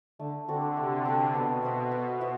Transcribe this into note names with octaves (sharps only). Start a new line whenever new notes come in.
D3 A3
D3 C4 F#4 A4
C3 A3
C4 F#4 A4
B2 B3
F#4 C5 E5
B3
F#4 C5 E5